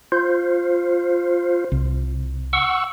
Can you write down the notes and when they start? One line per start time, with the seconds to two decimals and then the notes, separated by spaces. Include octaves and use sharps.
0.12 F4 C5
1.72 C2
2.53 F#5 C#6 E6